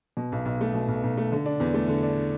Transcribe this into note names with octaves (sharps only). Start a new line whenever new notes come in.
B2
B1
B1
A3
B2
B1
B1
A3
D3
D4
E2
A3
D3
D4